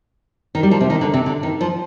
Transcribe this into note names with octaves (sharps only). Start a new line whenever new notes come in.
D#3
G3
F3
C3
D#3
D3
C3
D3
D#3
F3